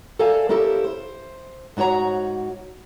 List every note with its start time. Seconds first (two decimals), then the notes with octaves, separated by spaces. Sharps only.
0.19 A4 A#4 D5 E5 F5 G#5
0.49 A#3 C#4 E4 G4 A4 A#4
0.84 C5
1.77 G#2 D4 F#4 C#5 A#5